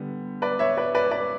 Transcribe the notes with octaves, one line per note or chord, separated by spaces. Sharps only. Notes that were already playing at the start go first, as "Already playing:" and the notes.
Already playing: D3 G3 B3
B4 D5
C#5 E5
B4 D5
B4 D5
B4 D5